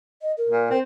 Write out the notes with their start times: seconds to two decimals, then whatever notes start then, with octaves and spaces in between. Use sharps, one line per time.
0.21 D#5
0.37 A#4
0.49 A#2
0.70 C4